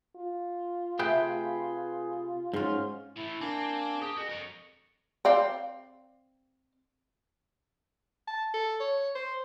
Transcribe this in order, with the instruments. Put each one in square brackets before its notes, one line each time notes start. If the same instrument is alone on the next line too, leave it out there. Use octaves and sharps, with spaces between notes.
[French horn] F4
[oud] C3 A3 [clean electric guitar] G#4 B4 G5
[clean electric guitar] G#2 F4 [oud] C4 F#4 [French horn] C#4
[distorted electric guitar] A2 E3 [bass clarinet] E4
[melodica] A#3 G#5 [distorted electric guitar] C4 [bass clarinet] D4
[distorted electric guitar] G4 G5 [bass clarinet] G#4
[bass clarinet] F2 [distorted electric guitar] F#4
[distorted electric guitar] A#4 C#5
[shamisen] C4 D5 F5
[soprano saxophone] A5
A4
C#5
C5